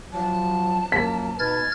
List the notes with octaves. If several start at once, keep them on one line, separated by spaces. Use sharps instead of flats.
F3 F#3 A5
F#2 F3 A#3 B6
B2 D#4 B4 F6 G#6 A6